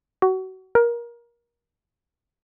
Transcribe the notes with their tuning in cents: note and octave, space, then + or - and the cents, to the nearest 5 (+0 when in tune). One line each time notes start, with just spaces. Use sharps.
F#4 +30
A#4 +25